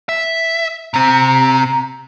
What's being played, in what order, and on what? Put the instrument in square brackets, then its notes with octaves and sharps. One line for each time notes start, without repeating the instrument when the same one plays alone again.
[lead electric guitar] E5
[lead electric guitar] C3 C4 [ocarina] A#5